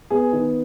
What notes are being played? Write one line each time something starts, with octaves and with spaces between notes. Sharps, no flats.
B3 G#4
D#3